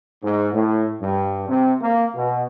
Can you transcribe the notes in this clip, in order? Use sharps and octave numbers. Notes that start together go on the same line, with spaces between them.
G#2
A2
G2
C3
A#3
B2